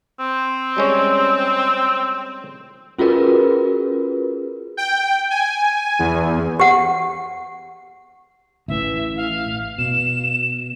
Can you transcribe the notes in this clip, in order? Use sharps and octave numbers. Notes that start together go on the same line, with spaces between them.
C4
G3 G#3 C#4
C#4 F4 F#4 G#4 A#4 B4
G5
G#5
E2
G4 F#5
A1 E3 E5
F5
B2 E7